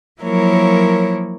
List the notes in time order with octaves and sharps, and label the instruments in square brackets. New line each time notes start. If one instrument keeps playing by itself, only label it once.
[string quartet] F3 F#3 A#3 E4 A#4 C#5